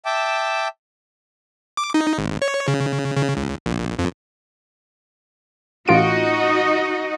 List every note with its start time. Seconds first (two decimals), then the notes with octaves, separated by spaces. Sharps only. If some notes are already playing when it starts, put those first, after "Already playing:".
0.05 E5 G5 A5 D6
1.77 D6
1.94 D#4
2.18 G#1
2.42 C#5
2.68 C#3
3.16 C#3
3.37 C#2
3.66 A#1
3.99 F2
5.88 A1 D#4 F4 F#4 D#5 D7